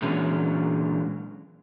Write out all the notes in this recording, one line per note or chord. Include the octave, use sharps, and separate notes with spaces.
A#2 D3 E3 F#3 G#3 C#4